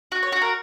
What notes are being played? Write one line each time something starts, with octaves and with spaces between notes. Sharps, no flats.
F#4
C#5
F#4
A#4